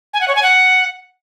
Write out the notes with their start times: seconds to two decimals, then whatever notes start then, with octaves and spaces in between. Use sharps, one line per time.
0.14 G#5
0.21 F#5
0.28 C#5
0.35 G#5
0.43 F#5